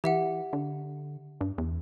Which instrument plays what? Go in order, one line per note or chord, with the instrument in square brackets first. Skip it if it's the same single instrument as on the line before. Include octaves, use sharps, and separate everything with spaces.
[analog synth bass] E3 [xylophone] G4 E5 F#5
[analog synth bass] D3
G2
E2